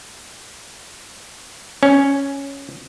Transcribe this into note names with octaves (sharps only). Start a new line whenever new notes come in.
C#4